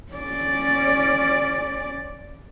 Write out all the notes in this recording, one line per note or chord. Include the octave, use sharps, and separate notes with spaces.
C#4 D5